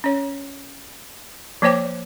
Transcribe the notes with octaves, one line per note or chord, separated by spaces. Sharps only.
C#4 C#5
F3 A#3 C5 C#5 G5 D6